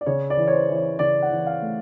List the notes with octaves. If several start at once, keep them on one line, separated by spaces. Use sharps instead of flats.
D5
C#3 C#5
D5
E3
C#5
C5
E3
C#5
C#3 D5
F#5
E3
F5
A3